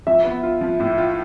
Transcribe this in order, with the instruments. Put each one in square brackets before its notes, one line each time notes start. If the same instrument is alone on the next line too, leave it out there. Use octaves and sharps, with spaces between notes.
[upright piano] F3 [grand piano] E5
[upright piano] B3
F4
F3
A2
F4